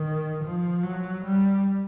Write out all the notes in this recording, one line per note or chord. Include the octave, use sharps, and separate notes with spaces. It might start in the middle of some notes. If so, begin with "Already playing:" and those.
Already playing: D#3
F3
F#3
G3